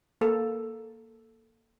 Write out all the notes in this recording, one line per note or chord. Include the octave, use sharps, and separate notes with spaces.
A#3 A4